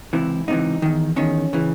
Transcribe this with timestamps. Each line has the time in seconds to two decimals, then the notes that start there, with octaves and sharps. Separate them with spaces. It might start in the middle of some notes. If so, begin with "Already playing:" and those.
0.13 C#2 C3 E3 E4
0.48 C#2 C3 E3 D#4
0.82 E2 D#3
1.16 E2 D#3 C#4
1.53 C#3 E3